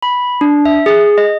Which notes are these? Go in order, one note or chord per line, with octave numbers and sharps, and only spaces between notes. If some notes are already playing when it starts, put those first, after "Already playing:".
B5
D4
E5
G#4
D#5